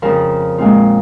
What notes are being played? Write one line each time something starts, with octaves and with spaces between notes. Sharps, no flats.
F2 C#3 F3 A#4
A#2 G#3 C4 F4